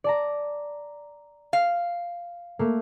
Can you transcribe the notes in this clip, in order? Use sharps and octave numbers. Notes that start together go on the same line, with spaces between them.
D5 A5 A#5
F5
A3 A#3